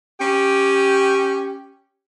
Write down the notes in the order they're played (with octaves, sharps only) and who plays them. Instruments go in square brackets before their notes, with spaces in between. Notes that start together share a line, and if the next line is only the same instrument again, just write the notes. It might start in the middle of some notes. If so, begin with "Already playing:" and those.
[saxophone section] C#4 G4